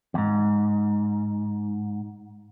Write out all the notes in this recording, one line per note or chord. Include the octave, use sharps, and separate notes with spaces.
E2 G#2